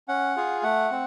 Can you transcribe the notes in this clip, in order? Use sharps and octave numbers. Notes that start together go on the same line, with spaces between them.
C#4 F#5
F4 G#4
A3 F#5
C4